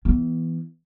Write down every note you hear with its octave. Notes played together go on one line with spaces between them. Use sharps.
E3 B3